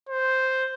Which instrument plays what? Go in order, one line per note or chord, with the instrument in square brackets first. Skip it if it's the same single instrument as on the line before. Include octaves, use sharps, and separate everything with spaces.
[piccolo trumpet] C5